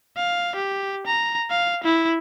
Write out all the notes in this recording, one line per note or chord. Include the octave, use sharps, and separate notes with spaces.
F5
G4
A#5
F5
E4